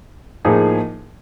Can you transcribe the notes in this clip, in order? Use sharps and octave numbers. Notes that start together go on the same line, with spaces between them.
A2 F3 A#3 D#4 G#4